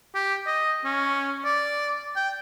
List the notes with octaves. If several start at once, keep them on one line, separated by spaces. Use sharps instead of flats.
G4
D#5
C#4
D5
G5